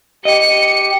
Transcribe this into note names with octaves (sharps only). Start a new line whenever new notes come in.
G4 D#5 C#7